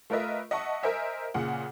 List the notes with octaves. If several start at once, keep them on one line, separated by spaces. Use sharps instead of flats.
A3 F4 A#4 B4 D#5 E5
D#5 E5 F#5 A5 C#6
A#4 C5 D#5 E5 G#5
A#2 C#3 F#5